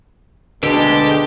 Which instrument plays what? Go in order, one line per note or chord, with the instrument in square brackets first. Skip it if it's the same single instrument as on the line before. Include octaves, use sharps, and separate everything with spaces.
[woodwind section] D2 B2 A5 [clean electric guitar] D3 [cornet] G#3 [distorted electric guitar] G4